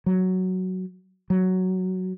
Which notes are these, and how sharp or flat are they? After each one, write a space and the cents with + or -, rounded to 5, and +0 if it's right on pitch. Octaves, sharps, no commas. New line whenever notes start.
F#3 +5
F#3 +5